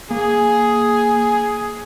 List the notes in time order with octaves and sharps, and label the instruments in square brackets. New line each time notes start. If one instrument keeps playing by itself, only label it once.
[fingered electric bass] A#3 [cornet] G#4